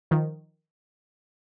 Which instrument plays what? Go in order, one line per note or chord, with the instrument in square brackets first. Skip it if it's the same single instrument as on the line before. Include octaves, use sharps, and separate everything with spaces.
[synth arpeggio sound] D#3 F3